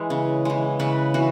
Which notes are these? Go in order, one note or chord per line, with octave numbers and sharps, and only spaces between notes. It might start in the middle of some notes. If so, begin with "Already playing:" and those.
Already playing: E3 G#3 G#4
C#3
E3 G#3
C#3 B4
E3 F#4